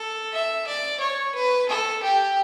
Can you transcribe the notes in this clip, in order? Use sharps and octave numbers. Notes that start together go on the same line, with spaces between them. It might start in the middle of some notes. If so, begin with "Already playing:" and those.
Already playing: A4
E5
D5
C#5
B4
A4
G4